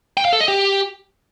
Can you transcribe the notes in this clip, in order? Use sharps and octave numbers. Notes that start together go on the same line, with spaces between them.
G5
F5
A4
D#5
G4